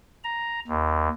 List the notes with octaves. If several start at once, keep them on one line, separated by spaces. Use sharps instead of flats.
A#5
D#2